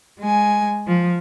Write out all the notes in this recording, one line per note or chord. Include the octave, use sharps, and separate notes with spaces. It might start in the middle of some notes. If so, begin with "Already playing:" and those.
G#3 G#5
F3